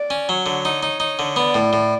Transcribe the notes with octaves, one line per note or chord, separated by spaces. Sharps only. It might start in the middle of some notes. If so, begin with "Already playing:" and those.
Already playing: D5
C#4
F#3 C#5
D3
D#4
D#4
D#4
D3
B3 D5
A2
A2